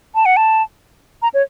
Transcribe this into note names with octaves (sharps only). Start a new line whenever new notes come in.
A5
F#5
A5
A#5
C#5